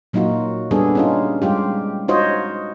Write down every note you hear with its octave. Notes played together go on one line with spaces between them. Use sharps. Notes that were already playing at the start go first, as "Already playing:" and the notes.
A#2 F#3 A#3 D#4 F4 F#4
G3 B3 D4 G#4 A4
C#4 D#4 F4
G3 G#3 F4 G4
D#4 F4 F#4 C5 C#5 D#5